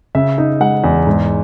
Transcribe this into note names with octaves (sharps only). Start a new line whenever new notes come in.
C#3 E5
D#4
G#3 F#5
E2
G#2